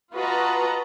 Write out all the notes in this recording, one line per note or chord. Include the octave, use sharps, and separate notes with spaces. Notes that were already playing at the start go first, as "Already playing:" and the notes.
F4 F#4 B4 D#5 A5 A#5